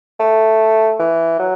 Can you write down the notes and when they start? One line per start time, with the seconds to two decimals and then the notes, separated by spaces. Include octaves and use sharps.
0.20 A3
1.00 E3
1.39 F#3